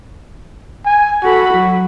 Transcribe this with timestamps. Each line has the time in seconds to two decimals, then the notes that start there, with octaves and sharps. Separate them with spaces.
0.86 G#5
1.23 F#4 A4 B5
1.54 F#3